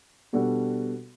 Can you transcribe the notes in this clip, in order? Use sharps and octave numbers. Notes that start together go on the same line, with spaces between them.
B2 G3 D4 F#4 A4